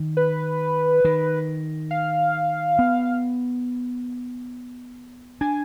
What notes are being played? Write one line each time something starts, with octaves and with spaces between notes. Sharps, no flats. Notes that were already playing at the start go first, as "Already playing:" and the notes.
Already playing: D#3
B4
D#3
F5
B3
D4 G#5